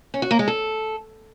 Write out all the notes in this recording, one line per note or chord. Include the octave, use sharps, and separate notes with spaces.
C#4
F#4
A#3
G#3
A4